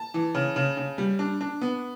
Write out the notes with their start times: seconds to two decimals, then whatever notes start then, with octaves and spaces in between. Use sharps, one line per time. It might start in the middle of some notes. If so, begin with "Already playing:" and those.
Already playing: A5
0.14 E3
0.35 C#3
0.56 C#3
0.77 C#3
0.98 G3
1.19 D4
1.41 D4
1.61 B3